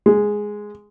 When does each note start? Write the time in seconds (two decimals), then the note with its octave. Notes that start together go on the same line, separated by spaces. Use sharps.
0.06 G#3